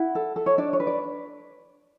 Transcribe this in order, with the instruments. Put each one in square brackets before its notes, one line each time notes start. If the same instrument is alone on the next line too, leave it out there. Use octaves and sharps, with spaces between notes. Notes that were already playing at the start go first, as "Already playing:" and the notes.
Already playing: [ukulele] E4 F#5
A4
A4
C#5
D4 D5
C#5
B4
D5